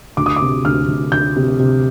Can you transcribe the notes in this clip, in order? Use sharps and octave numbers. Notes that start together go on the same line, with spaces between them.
D2 D6
D#6
D6
C3
D2 F6
D2
D2 G6
C3
C3